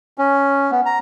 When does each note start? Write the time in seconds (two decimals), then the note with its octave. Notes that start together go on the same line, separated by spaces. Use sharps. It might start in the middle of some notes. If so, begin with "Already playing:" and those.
0.18 C#4
0.71 B3
0.86 A#5